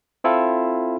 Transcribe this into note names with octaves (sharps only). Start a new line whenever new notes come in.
C4 E4 F4 A4